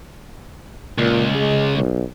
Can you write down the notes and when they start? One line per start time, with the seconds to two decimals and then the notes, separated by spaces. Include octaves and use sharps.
0.98 C#2 A#2
1.35 G#3
1.78 B1